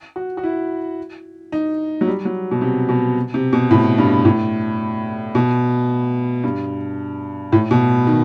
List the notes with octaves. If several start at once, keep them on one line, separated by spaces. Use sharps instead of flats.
F#4
F#4
E4
D#4
F#3
G3
F#3
B2
C3
B2
C3
B2
A2
G2
A2
B2
G2
A2
B2
D#3